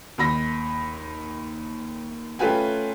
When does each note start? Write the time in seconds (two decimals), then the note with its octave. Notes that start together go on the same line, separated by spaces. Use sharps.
0.18 D#2 D#4 B5 A#6
2.39 A3 C#4 F4 B4 G5 G#5